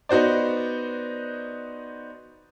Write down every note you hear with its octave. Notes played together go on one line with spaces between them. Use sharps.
B3 D#4 F#4 C5 D5